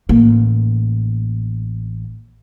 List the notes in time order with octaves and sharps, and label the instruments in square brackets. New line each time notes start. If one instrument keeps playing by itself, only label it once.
[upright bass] A1 A#3